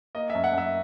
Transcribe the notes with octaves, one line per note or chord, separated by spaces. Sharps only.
A#3 D#5
F#2 E5
F#5
F#2 E5